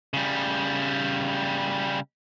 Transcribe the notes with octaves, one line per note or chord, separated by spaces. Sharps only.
C#3 G3